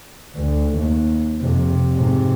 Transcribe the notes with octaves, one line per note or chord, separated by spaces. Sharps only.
D2
D#2
F2 C3
G#2 C3